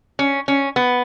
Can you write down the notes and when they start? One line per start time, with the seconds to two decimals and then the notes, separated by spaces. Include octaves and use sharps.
0.19 C#4
0.48 C#4
0.76 B3